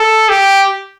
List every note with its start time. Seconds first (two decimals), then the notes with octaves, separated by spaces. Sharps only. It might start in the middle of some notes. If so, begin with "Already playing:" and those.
Already playing: A4
0.29 G4